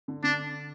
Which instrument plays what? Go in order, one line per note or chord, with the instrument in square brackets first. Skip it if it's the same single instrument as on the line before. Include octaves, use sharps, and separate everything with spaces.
[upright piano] D3
[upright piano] D3 [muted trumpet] D4